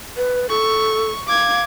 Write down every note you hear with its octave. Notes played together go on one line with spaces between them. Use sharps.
B4
A4 C#6
F5 D6 G#6